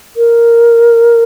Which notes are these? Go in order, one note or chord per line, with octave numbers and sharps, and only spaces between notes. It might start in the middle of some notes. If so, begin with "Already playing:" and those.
A#4